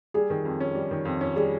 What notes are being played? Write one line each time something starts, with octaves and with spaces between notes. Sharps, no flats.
G3 G#4
D#3
F2
C#4
G3
D#3
F2
C#4
G3 G#4